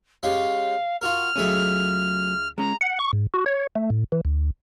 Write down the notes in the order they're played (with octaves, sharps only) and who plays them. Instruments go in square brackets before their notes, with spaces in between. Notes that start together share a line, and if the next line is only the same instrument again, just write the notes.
[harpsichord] G#3 C#4 G4 [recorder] F5
[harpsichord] F4 F#4 A#4 [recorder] F6
[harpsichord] C#2 G#4 E5 [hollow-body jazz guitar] F#3 A3 C#4
[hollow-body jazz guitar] G#3 C#4 [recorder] A#5
[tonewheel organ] F#5
C#6
G#2
F#4
C#5
A3
A2
E3
D2